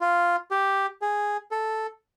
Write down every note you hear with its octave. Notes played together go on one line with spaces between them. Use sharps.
F4
G4
G#4
A4